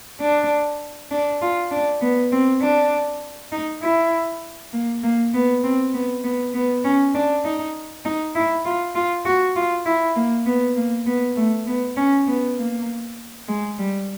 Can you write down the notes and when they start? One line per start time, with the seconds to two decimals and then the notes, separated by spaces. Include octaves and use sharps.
0.21 D4
1.11 D4
1.41 F4
1.71 D4
2.01 B3
2.32 C4
2.62 D4
3.52 D#4
3.82 E4
4.73 A#3
5.03 A#3
5.34 B3
5.63 C4
5.94 B3
6.24 B3
6.54 B3
6.84 C#4
7.14 D4
7.45 D#4
8.05 D#4
8.35 E4
8.65 F4
8.95 F4
9.25 F#4
9.56 F4
9.86 E4
10.16 A#3
10.46 B3
10.76 A#3
11.06 B3
11.36 A3
11.67 B3
11.97 C#4
12.27 B3
12.57 A#3
13.48 G#3
13.78 G3